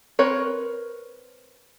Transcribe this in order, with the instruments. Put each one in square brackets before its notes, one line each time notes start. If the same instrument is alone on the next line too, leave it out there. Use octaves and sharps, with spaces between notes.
[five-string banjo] C4 A#4 B4 C#5